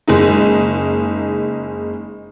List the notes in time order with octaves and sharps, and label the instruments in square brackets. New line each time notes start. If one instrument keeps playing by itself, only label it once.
[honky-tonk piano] F#1 G#3 D#4